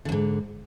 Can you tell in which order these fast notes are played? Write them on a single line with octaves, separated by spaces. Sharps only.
D3 E2 G#2